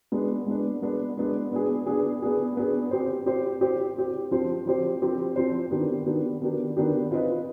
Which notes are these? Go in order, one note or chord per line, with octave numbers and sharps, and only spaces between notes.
G#3 B3 D4
G#3 B3 D4
G#3 B3 D4
G#3 B3 D4
B3 D4 G#4
B3 D4 G#4
B3 D4 G#4
B3 D4 G#4
C4 G4 C5
C4 G4 C5
C4 G4 C5
C4 G4 C5
F3 C4 G4 C5
F3 C4 G4 C5
F3 C4 G4 C5
F3 C4 G4 C5
D#3 B3 D4 G4
D#3 B3 D4 G4
D#3 B3 D4 G4
D#3 B3 D4 G4
C4 F4 B4 D#5